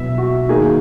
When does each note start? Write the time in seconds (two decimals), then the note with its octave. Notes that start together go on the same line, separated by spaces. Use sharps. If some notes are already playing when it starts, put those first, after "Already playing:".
Already playing: B2 F#3 B3 E4 E5
0.18 F#4
0.49 D#3 A#3 D#4 F#4 G#4